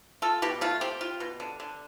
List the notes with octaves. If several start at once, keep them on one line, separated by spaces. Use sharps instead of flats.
F4 A4
B2 G4
A3 F4
C4 G4
F4
B2
D3
D3